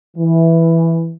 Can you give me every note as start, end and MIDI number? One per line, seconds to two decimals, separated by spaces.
0.16 1.13 52